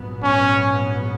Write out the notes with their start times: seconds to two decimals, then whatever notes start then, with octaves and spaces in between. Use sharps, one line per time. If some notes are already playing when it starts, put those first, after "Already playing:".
Already playing: A#1 G#2 F#3 B3
0.24 C#4